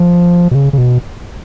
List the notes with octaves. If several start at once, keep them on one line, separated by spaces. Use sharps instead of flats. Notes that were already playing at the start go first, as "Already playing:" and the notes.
Already playing: F3
B2
C#3
C#3
B2